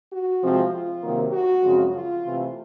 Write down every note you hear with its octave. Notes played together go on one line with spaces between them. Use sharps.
F#4
C3 F3 G#3 C4
F4
C3 D#3 F#3 A#3
F#4
F#2 C#3 F3 G#3 C4
F4
C3 E3 A3